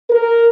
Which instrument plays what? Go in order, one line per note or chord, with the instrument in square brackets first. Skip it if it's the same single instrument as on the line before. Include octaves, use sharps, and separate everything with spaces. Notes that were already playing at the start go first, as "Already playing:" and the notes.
[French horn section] A#4